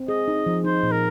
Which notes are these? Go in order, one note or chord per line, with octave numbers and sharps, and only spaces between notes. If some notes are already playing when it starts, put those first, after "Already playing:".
Already playing: C4
G#4 D#5
D#4
F3
D#4 C5
A#2
A#4